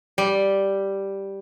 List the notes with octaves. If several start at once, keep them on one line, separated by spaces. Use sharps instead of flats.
G3